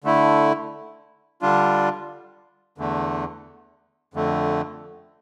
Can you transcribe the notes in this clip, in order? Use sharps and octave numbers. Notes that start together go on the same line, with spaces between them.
D3 A3 E4
D3 G3 D4 F4
E2 D3 A3
F2 D3 A3